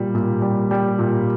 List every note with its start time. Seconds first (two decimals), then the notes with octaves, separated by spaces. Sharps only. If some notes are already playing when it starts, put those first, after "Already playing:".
Already playing: A#2 G3
0.15 A#2
0.42 G3
0.71 G3
0.99 A#2